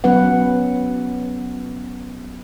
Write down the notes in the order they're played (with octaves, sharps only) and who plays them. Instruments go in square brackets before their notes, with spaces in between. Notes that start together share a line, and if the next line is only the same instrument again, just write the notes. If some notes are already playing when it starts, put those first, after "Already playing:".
[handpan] F#3 B3 C#4 B4 F#5